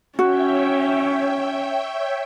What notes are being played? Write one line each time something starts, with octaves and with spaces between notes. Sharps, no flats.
C#4 F#4 C#5 E5 G5